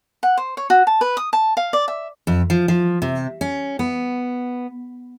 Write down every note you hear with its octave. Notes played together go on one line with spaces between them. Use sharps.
F#5
C5
C#5
F#4
A5
B4
D#6
A5
F5
D5
E5
F2
F3
F3
C3
C#4
B3